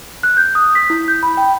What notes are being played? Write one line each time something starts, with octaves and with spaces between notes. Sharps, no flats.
F#6
G6
D#6
B6
E4
G6
B5
G5